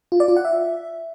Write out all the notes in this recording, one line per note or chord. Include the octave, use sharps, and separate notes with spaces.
F4
D5
F4
F#5
E5